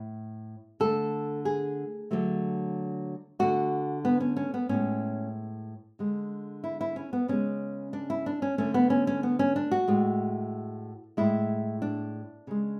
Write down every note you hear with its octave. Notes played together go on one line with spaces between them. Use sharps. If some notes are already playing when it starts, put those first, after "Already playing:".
Already playing: A2
D3 A3 A4
G#4
D3 F#3 A3
D3 A3 F#4
B3
C#4
C#4
B3
A2 G#3 C#4
D3 G#3
E4
E4
C#4
B3
C#3 G#3 C#4
D4
E4
D4
C#4
D3 A3 C#4
B3
C#4
C#4
B3
C#4
D4
F#4
A2 G#3
A2 G#3 E4
D4
C#3 G#3